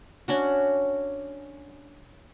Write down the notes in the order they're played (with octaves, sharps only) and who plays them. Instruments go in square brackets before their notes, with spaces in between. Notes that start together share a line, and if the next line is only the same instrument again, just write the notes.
[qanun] C#4 D4 F#4